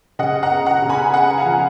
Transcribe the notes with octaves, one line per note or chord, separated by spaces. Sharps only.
C#3 D#5 F#5
F#5 A#5
B3
F#5 A#5
C#3
G#5 B5
B3 F#5 A#5
F5 G#5
F3